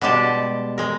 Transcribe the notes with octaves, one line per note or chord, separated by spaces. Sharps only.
B2 G3 G#3 G4 A5
G#3 A#4